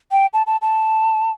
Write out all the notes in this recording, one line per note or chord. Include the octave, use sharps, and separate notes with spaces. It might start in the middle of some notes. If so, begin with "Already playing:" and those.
G5
A5
A5
A5